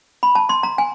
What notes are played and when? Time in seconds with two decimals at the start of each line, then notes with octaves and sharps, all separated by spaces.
0.23 B5
0.35 A5
0.49 C6
0.63 A#5
0.78 G#5